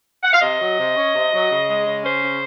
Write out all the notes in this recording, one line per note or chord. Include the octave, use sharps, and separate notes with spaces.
F#5
F5
C3 D#5
F#3
C3
C#4
C3
F#3
C#3
G#3
C#3
C#4 C5
C#3